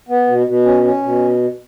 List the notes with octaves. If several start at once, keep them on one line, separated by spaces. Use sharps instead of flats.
B3
B2
B2
C#4
C#4
B2